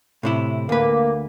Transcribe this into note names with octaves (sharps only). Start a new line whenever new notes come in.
A2 C3 E4
D2 A#3 B4